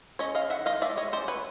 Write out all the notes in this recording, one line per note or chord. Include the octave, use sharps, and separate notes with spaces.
C#4 C#5 D#5
D#5 F5
D#3 E5 F#5
D#5 F5
G#3 D5 E5
C#5 D#5
C#4 C5 D5
B4 C#5